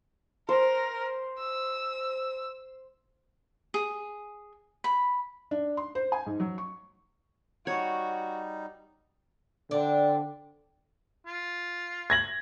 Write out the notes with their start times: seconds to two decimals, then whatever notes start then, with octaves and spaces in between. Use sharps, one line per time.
0.49 A#4 C5
1.39 E6
3.74 G#4
4.84 B5
5.51 D4
5.77 C6
5.95 C5
6.12 G#5
6.26 G#2
6.40 F#3
6.58 C#6
7.67 G3 D#4 F#4 C#5
9.71 D3 C4 D4
11.27 F4
12.10 G#6 A#6 F#7